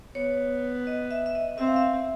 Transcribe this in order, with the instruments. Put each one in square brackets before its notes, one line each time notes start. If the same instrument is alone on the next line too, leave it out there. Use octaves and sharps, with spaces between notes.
[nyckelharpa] B3 [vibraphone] C#5
[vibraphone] D#5
E5
E5
D#5
[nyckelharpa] C4 [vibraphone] E5
[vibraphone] F5
E5